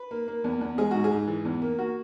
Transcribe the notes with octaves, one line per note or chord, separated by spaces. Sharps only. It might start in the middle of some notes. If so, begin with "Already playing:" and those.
Already playing: B4
A#3
A#3
E2
E2
G#3 G#4
G#2 F#4
G#4
G#2
E3
E2
A#3
A#3 F#4